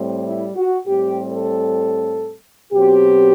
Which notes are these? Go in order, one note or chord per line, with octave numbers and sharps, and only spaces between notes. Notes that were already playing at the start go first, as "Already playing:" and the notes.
Already playing: A2 G3 C4
E4
F#4
A2 G3 C4 G4
A4
B2 F#3 C4 G4